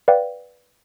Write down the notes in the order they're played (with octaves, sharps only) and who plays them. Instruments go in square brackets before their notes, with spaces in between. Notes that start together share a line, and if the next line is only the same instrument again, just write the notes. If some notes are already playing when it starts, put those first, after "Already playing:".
[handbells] B4 D5 F5 G5